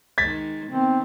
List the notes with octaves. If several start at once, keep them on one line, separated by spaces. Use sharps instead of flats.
D#3 G#3 G#6 A6 B6
D#3 B3 C4